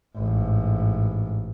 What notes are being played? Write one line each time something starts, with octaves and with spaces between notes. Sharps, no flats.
A1 G#2